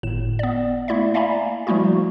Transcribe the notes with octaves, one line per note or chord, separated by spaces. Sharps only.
G1 A2 E7
B3 D5
A3 A#3 E4 D5 E5
D5 E5 F5 G#5 A#5 B5
F3 G3 A3 A#3 E4 F#4